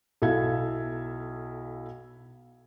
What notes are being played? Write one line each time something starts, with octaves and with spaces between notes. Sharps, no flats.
B1 E4 A4 E5 F5 G#6